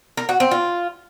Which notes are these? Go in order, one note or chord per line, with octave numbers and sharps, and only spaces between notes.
A#4
F#4
C4
F4